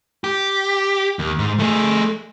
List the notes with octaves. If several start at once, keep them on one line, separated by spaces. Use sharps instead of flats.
G4
D#2
G#2
A3 G#4